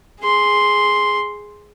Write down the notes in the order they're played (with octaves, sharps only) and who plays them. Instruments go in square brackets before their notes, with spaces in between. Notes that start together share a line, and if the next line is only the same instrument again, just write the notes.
[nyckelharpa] G#4 C6